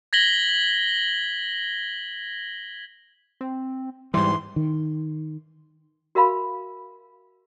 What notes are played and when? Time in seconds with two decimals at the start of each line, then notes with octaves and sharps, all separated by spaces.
0.13 G#6 A#6 B6 F#7 G7
3.41 C4
4.14 G#2 E3 G3 C6
4.56 D#3
6.15 F#4 A#4 E5 F5 B5